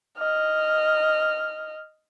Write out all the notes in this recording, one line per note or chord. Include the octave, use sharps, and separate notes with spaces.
D#5 F6